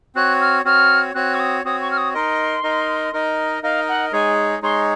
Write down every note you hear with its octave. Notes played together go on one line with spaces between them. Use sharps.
C4 F#4 C#5 F#6
F6
C4 F#4 C#5 F6
C4 F#4 C#5 F#6
C#6
D#6
C4 F#4 C#5 D#6
C#6
F6
D#6
D#4 A#4 D#5 C6
D#4 A#4 D#5
D#4 A#4 D#5
D#4 A#4 D#5 F5
F#5
G#3 D#4 G#4 C#5 G#5
G#3 D#4 G#4 C#5 C6